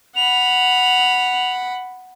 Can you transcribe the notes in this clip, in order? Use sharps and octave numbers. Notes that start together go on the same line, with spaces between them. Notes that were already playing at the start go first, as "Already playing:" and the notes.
F#5 B5 F7